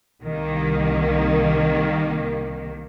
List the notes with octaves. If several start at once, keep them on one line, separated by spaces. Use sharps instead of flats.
C2 D#3 A#3